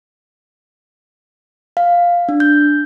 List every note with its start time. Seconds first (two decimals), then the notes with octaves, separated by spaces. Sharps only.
1.77 F5
2.29 D4
2.40 G6